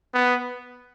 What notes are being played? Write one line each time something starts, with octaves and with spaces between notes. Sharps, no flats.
B3